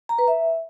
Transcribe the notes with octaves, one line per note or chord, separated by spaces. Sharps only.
A#5
B4
E5